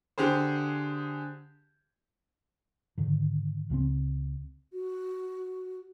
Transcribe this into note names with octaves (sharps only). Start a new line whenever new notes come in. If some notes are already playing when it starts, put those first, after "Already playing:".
D3 G4 G#4 C5
G#2 D3 D#3
C#2 C#3 G#3 C4
F#4